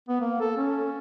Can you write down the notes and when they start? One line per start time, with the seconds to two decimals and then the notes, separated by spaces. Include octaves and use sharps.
0.09 B3
0.21 A#3
0.41 A4
0.57 C#4